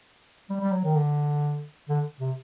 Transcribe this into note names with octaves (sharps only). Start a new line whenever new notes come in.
G3
G3
F#3
D#3
D3
D3
C3